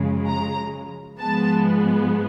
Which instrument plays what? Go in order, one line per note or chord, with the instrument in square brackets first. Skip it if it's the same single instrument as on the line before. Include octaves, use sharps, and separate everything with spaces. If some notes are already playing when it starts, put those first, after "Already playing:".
Already playing: [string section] F#2 C#3 F3 G#3
A#5
G#2 F3 G#3 B3 A5